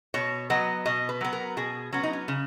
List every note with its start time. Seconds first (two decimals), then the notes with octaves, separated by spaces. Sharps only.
0.14 B2 C#5
0.50 F#3 B3 D#5
0.86 B2 D#5
1.09 B4
1.21 F#3 B3
1.33 A#4
1.57 B2 G#4
1.92 F#3 B3 C#4
2.03 D#4
2.13 C#4
2.28 C#3